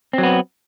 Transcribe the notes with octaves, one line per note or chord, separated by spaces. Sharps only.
F#3 B3 C4